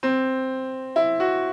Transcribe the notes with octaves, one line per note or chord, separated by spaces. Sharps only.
C4
E4
F#4